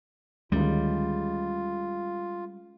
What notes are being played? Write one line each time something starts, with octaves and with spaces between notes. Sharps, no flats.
D2 D#3 G3 G#3 C#4 F4